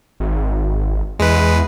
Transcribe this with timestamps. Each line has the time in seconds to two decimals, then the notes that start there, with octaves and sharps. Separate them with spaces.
0.20 G#1
1.19 E2 G#3 B4